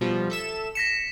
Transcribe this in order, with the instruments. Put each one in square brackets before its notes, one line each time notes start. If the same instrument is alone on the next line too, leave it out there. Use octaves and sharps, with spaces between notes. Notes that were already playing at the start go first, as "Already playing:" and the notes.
[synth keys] B2 F3 G3
A4 E5 E7
[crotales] A#6 B6 E7 [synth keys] C#7